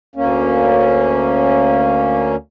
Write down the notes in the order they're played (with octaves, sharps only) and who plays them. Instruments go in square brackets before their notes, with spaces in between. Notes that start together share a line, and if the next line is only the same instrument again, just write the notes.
[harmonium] D2 A#3 C#4